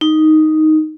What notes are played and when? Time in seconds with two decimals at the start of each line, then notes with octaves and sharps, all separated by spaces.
0.01 D#4